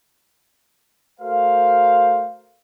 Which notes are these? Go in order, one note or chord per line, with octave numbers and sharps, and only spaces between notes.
A3 F#4 A#4 C5 F5